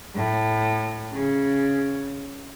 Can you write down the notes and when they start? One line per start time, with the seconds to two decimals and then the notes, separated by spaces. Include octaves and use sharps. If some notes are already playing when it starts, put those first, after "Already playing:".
0.15 A2
1.12 C#3